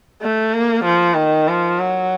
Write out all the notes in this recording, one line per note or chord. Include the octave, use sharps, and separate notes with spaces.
A3
A#3
F3
D#3
F3
F#3